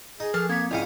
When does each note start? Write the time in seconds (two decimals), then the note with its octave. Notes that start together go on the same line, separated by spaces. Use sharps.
0.20 D#4 G#4
0.34 F3 A4 A5 F6
0.49 A#3 C4 G#6 B6
0.71 C#2 G#2 E4 D5 F5 G5 G#5 C#7